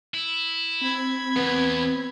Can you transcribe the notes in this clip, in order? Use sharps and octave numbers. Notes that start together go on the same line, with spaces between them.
E4
C4 B5 G#6
E2 B3